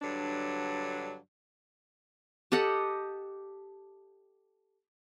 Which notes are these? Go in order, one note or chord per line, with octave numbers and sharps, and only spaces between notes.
G2 D3 F#3 D4
G4 A4 D#5 F#5